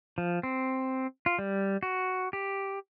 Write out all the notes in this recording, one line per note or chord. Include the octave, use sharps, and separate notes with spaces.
F3
C4
F4
G3
F#4
G4